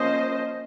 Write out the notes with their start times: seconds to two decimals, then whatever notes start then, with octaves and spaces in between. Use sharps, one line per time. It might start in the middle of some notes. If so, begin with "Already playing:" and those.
Already playing: F3 A#3 C#4 C5 D#5